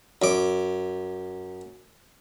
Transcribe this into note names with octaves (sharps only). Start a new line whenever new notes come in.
F#2 D6